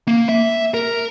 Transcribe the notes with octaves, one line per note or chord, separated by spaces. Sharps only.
A#3
E5
A#4